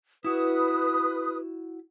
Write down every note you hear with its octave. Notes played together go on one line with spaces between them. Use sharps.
E4 F#4 B4 D#6